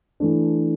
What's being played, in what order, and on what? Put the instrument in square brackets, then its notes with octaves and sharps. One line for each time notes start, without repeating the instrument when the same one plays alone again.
[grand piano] E3 A3 D4